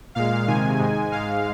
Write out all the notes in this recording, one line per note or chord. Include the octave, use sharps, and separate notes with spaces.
A#2 G#3 F5
C3 D#3 G#3 G#5
G#2 G#3
G#2 G#3 F5